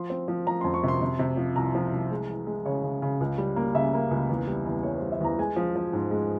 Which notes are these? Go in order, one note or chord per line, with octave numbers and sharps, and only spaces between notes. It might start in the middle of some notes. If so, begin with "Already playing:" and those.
Already playing: F3 C6
C4
F3
F3 A#5
F2 C6
C#6
C3 C6
C3
C3
F3
C2 A#5
F3
C2
G#3
E3
G#3
C#3 C#5
C#3
C#3
C#2
G3
A#3
C#3 E5
A#3
C#2
E2
G3
E2
G3 C#5
G3 C5
E5
E2 A#5
G#3 G#5
F3
F3
G#2
G#3